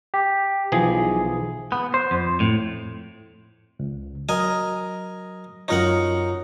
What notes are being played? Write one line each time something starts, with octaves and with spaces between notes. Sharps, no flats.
G4
B1 E3 F3 G#4
B3
C5
F2
A2
C#2
F#3 A#4 D#5 G#5
F#2 D#4 F4 A#4 C#5 F#5